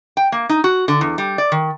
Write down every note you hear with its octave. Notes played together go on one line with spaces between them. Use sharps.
G5
A#3
D#4
F#4
D3
E2
G3
D5
D#3